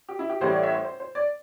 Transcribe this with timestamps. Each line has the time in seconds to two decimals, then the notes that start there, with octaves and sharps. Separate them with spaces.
0.09 G4
0.19 E4
0.30 G4
0.40 A1 A2 E3 G3 C5
0.51 D5
0.63 E5
0.73 C5
0.85 C5
1.00 C5
1.15 D5